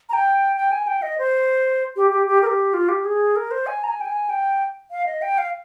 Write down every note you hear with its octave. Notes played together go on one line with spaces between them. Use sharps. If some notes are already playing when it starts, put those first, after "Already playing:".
A#5
G5
G5
G#5
G5
D#5
C5
G4
G4
G4
A#4
G4
F4
G4
G#4
A#4
C5
G#5
A#5
G#5
G5
G#5
G5
F5
D#5
G5
F5